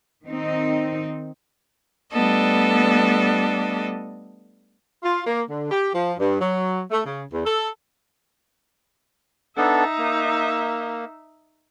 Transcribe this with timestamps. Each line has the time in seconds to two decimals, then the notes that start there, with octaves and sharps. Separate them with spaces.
0.24 D#3 C4 D#4
2.11 G3 A3 B3 D4 A4 D#5
5.03 F4
5.26 A#3
5.49 D3
5.70 G4
5.93 F3
6.19 G2
6.40 F#3
6.91 A3
7.05 C#3
7.33 E2
7.45 A4
9.57 B3 D4 D#4 A4 E5
9.98 A#3